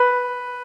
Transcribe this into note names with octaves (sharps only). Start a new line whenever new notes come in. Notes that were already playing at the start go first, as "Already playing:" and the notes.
Already playing: B4